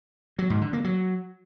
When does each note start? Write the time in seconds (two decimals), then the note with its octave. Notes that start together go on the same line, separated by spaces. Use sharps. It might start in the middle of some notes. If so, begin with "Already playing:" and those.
0.39 F#3
0.50 G#2
0.61 D3
0.73 A#3
0.84 F#3